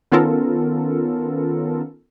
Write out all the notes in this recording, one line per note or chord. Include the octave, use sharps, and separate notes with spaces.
D#3 B3 C#4 F4 A4 A#4